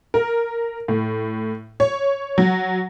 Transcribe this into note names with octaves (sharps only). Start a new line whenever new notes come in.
A#4
A2
C#5
F#3